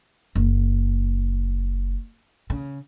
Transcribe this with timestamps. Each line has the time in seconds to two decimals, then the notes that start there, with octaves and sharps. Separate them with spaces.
0.35 F#1
2.50 C#3